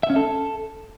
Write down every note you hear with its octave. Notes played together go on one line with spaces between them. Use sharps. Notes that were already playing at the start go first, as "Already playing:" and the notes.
E5
C#4
A4